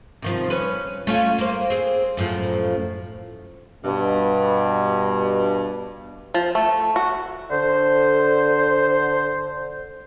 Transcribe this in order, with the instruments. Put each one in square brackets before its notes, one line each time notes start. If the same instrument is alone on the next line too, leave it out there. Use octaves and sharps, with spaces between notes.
[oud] C3 D#3 F3
C#4 B4
A3 C#4 F4
A#3 C5
C4 G#4
F#2 A2 F3
[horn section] G2 B2
[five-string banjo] F3
A3
F#4
[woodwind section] D3 C5